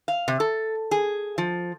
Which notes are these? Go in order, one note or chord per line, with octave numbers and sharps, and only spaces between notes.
F5
C3
A4
G#4
F3